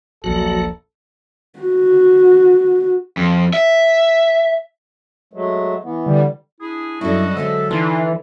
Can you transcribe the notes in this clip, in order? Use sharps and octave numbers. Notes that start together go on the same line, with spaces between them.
D#1 A#1 F#3 F#4 A4
F#4
F2
E5
F#3 G#3 A3
E3 B3
D3 G3
D4 E4 G#4
F#2 G3 D4 E4 F#4 A4 D#5
D3 F#3 G#3 A4 C5 E5
E3 D#4 F4 A4